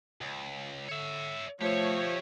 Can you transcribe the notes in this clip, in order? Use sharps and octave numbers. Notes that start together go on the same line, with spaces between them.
C#2
D3 C#5 E5
F3 A3 G4 C#5 E5